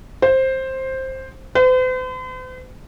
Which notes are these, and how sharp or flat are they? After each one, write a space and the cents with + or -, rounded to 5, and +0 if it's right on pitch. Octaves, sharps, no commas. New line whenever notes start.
C5 +10
C5 -45